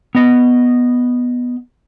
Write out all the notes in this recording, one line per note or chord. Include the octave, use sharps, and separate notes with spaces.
B3 D#5